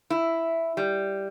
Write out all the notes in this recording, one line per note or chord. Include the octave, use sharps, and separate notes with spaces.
E4
G3